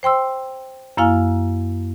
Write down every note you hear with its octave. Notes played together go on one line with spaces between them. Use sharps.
C5 G5 C6 E6
F#2 A#3 E4 F5 G#5 F6